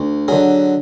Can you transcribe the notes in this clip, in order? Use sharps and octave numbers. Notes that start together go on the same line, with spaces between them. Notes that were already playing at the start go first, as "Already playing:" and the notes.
Already playing: D2
D3 F#3 G#4